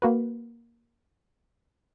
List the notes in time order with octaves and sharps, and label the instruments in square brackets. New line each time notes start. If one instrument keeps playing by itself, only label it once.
[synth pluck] A#3 F#4 B4